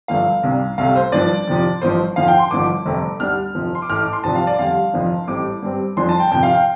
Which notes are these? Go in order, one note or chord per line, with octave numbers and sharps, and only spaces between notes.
G1 G2 F3 A3 F5
C2 C3 G3 D4
C2 C3 A3 F5
C5
G2 F3 D4 D5
F2 C3 F3
A1 G2 F3 C5
F2 D3 F3 F5
G5
C6
A1 G2 D3 F3 D6
G1 F2 C3 A3 C4
D2 D3 G3 D4 F6
F1 F2 F3
C6
D6
A1 A2 A3 F6
D6
C6
C2 C3 F3 D4 A5
F5
D5
F2 D3 G3 F5
F1 F2 F3 D4
A1 A2 G3 C4 D6
G2 G3 C4
G1 F2 F3 D4 C6
A5
G5
F2 C3 F3 G5
F5
G5